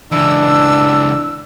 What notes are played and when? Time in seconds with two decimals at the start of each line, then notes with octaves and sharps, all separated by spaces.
0.12 C#2 E3 D4 E6